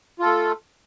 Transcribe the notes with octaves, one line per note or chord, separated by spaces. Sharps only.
A3 F4 A4